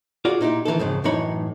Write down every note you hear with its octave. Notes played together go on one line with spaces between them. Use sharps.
F4 F#4 G#4 D5
A#2 D#4 E4 G4
D#3 E3 E4 A4
F2 G#2 C#3
F#2 A2 E3 D#4 C#5 B5